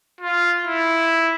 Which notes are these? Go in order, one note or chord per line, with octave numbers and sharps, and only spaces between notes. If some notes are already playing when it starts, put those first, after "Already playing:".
F4
E4